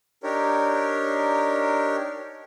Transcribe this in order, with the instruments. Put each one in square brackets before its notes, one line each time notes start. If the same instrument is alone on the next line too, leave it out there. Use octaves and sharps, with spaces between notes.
[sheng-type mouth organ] D4 D#4 G4 A#4 C#5